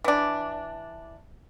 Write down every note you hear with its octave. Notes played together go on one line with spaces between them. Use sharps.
E3 D4